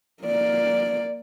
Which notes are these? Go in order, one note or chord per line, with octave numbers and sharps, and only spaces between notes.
A#3 D5